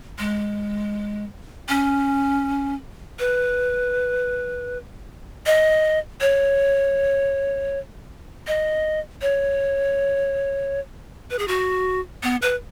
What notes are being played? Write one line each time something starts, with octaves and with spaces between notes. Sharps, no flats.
G#3
C#4
B4
D#5
C#5
D#5
C#5
B4
G#4
F#4
B3
B4